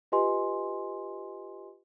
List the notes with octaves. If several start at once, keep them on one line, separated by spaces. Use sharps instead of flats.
F4 G4 B4 D#5 G#5 C6